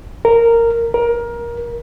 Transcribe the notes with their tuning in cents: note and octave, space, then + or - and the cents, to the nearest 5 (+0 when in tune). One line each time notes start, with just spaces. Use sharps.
A#4 -10
A#4 +20